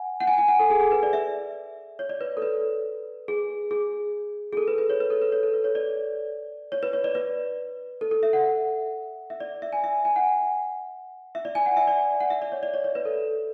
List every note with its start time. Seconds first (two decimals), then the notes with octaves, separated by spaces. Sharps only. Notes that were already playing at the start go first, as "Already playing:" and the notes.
Already playing: F#5 G#5
0.20 F#5
0.27 G#5
0.38 G#5
0.48 F#5
0.59 A4
0.70 G#4
0.81 G#4
0.92 B4
1.03 D5
1.13 E5
1.99 C#5
2.09 D5
2.21 B4
2.37 A4
2.42 B4
3.28 G#4
3.71 G#4
4.53 G#4
4.57 A4
4.68 B4
4.78 B4
4.90 C#5
5.00 B4
5.10 A4
5.22 B4
5.32 C#5
5.43 A4
5.54 B4
5.64 C#5
5.75 D5
6.72 C#5
6.83 B4
6.93 C#5
7.04 D5
7.15 B4
8.01 A4
8.11 A4
8.23 E5
8.33 F#5
9.30 E5
9.40 D5
9.62 E5
9.73 G#5
9.84 E5
10.05 G#5
10.16 F#5
11.35 E5
11.45 D5
11.55 G#5
11.66 F#5
11.77 E5
11.87 D5
12.21 F#5
12.30 E5
12.42 D5
12.52 C#5
12.63 D5
12.74 C#5
12.84 C#5
12.95 B4
13.05 A4